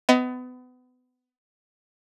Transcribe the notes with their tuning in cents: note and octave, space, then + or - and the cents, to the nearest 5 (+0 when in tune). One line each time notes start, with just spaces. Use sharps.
B3 +30 D#5 +25